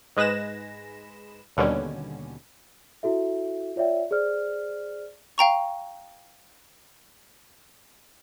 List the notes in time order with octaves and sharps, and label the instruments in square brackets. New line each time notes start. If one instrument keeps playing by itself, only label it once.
[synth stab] G#2 G#3 B4 A#6 E7
D#2 B2 D3 G3 C#4
[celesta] E4 F#4 A4 E5
F4 C#5 D5 E5 G5
G#4 C5 D5 F6
[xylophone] F5 G5 A#5 C#6